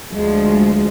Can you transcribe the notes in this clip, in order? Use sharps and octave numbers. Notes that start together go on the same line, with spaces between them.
D2 F3 G#3